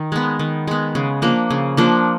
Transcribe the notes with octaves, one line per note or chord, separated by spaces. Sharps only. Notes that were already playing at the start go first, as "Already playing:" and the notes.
Already playing: D#3
G#3 B3
D#3
G#3 B3
C#3
F3 A#3 D4
C#3
F3 A#3 D4